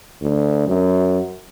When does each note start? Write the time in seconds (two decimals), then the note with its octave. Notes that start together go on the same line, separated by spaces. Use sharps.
0.21 D2
0.67 F#2